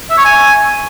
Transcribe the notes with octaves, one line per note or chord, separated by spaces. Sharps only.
E5
C#5
G#5